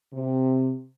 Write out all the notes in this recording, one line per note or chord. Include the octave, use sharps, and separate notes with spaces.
C3